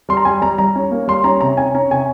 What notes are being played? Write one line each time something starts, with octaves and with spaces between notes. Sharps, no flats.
G3 C6
A#5
G3 G#5
G3 A#5
G3 A#5
C#4
A#3
G3 C6
C#4 A#5
C3 A#5
C#4 G#5
C#4 A#5
C3 G#5